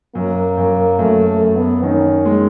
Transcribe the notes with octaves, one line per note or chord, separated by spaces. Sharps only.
F#2 A#3
F#2
F#2 A3
A3
F#2
B3
D#3 C#4
G#3